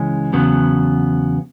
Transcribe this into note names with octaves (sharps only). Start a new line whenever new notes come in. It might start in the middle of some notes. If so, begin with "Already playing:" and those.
Already playing: C#2 C#3 E3 G#3 C#4
E2 C#3 F#3 B3